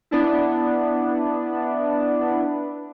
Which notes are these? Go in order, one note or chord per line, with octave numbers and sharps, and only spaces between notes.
B3 D4 E4